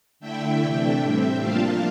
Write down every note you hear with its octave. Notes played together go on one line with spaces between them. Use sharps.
D3 A3 E4 E5 G5
C3 E3 A3 D4
A2 G3 C4 E5 G5
F3 A#3 D4 F4 F5 A5